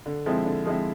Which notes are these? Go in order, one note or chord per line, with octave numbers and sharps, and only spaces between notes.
D3
F3 G#3 C4 E4
D3
F3 G#3 C4 E4